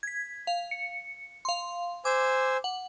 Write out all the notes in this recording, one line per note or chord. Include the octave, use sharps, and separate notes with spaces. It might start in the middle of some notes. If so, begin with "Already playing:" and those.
G#6 B6
F5
C#7
F5 C6
C5 G#5 D6 E6
F#5